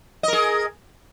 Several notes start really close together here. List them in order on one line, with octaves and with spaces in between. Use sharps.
D#5 A#4 G#4